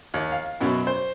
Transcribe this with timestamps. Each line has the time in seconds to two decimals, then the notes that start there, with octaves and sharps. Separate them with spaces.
0.14 D#2
0.32 F5
0.61 F#2 B2 F#3
0.87 C5